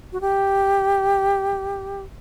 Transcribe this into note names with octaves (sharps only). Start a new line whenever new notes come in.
F#4
G4